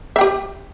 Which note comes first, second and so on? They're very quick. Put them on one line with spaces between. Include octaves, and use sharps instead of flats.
E5 G5 G4